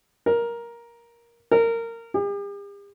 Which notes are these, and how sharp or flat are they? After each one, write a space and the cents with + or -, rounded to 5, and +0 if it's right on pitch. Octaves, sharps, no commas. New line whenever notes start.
A#4 +10
A#4 -20
G4 +45